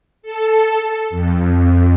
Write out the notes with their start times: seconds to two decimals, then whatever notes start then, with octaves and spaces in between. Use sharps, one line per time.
0.22 A4
1.10 F2